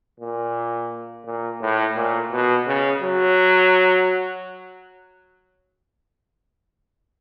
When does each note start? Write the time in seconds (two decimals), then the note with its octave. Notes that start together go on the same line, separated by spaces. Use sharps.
0.20 A#2
1.25 A#2
1.61 A2
1.96 A#2
2.31 B2
2.67 C#3
3.02 F#3